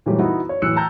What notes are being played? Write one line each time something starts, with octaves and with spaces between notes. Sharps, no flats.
A#2 E3 F#3 G3 A3 G4
B3 D#4 E4 F#4
C#5
A2 E3 F#3 E6 F#6 C#7
G5 A5 A#5 E6 G6